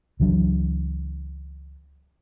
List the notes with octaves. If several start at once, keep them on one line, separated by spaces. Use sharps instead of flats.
C#2 E3 F#3 D4